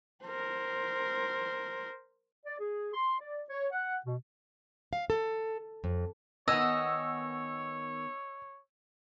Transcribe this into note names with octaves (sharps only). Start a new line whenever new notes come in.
A#4 C5
D5
G#4
C6
D5
C#5
F#5
B2
F5
A4
F2
D#3 B3 C#5 D#5 G#5 E6